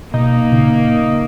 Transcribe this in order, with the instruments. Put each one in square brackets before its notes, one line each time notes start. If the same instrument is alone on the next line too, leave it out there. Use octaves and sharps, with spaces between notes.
[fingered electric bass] B2 [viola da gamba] A#3 [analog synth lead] D#4
[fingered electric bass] A#2 C#3 C#4